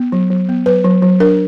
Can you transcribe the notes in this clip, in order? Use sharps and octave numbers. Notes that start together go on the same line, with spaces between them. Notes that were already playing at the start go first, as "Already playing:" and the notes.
Already playing: B3
F#3
F#3
B3
F#3 B4
F#3
F#3
D4 A#4